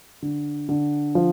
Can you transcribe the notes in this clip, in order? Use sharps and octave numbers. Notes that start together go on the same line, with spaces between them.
D3
D3
F3